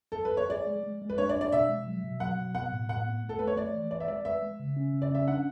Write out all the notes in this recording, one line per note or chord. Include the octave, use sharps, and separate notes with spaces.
A4
B4
C#5
G#4 D5
G#3
G#3
G#3
B4
D4 C#5
D5
D4
D5
B2 E5
G#3
F#3
B2
F#3 F#5
B2
B3 F#5
A2
A2 F#5
B3
A3
A4
A3 B4
C#5
A3 D5
E3
B4 D5
E5
G#3 D5
B4 E5
G#3
C#3
C#4
C#3
D5
C#4 E5
D4 F#5